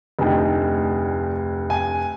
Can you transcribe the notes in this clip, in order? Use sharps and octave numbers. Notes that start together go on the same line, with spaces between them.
F1 D2 D#4 G#4 G5
G#5